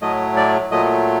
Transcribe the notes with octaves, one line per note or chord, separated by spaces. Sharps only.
A2 F#3 A3 D#5
D5
A#2 F#3 A3 D#5